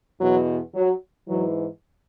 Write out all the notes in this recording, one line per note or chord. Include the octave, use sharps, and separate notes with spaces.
E2 B2 F#3
F#3
G#2 E3 F#3